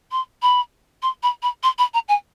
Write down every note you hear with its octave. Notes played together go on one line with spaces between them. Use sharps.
C6
B5
C6
B5
B5
C6
B5
A#5
G#5